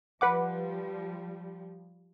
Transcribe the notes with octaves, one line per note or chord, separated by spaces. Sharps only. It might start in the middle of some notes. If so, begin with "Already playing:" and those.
F3 G3 B4 F#5 D6